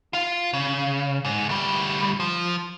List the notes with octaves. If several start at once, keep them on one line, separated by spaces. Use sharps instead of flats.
F4 F5
C#3
G#2
D2 G3
F3